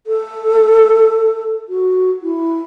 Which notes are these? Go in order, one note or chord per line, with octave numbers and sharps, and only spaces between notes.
A4
F#4
E4